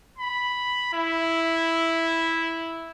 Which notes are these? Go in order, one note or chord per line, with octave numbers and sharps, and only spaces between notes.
B5
E4